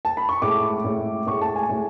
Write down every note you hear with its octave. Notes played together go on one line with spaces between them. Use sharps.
A5
B5
C#6
A2 G#3 D6
A2 G#3
A2 G#3 C#6
A5
G#5
A2 G#3